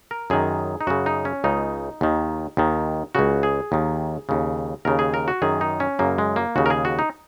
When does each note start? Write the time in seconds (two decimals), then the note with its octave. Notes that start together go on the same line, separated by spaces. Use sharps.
0.11 A#4
0.30 F#2 D#3 G#4
0.81 D#4
0.87 F#2 C#3 F#4
1.06 D#4
1.25 C#4
1.44 C#2 C#3 D#4
2.01 D#2 D#3
2.57 D#2 D#3
3.15 C#2 C#3 F#4
3.43 G#4
3.72 D#2 D#3
4.29 D#2 C#3
4.85 D#2 C#3 A#4
4.99 G#4
5.14 A#4
5.28 F#4
5.42 F#2 D#3 G#4
5.61 D#4
5.80 C#4
5.99 F#2 C#3 A#3
6.18 G#3
6.36 A#3
6.56 D#2 C#3 F#4
6.66 A#4
6.70 G#4
6.85 F#4
6.99 D#4